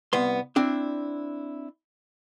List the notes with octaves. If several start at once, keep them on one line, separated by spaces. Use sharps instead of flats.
C2 B3 C6
C4 D4 E4